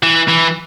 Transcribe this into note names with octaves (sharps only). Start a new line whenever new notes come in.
E3
E3